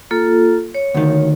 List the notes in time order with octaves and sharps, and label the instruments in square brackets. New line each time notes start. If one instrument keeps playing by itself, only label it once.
[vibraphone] A#3 F4 A4
C#5
[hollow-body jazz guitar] D2 D#3